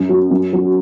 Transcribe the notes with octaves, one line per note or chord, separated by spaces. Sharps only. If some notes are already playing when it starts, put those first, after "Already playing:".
Already playing: F#2
F#3
F#2
F#3